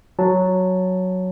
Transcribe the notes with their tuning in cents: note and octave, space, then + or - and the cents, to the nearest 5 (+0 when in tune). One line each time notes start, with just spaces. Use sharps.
F#3 +0 A5 +0